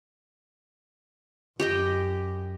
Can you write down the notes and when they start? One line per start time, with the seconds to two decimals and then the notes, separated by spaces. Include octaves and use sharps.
1.60 F#2 G4 D#5 G5